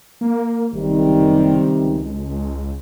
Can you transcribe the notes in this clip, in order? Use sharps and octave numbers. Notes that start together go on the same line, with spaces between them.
A#3
F#1 C3 D#3 G3
C#2
C#2